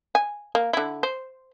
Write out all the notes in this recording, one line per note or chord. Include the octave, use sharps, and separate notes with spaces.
G#5
A#3
D3 E4
C5